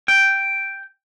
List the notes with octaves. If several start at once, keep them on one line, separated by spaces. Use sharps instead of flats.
G5